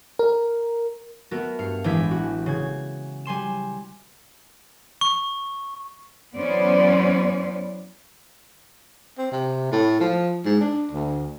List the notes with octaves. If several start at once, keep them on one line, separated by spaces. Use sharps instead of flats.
A#4
A3 B3 F#4 A#4
G2 F5 C#7
A1 E3 G#3 D4 G#6 B6
F#4
C#3 G#6
G3 G#5 C6 E7
C#6
F#2 E3 B3 C#4 C5 D5
C4
C3
A2
F3
G#2
D4
D2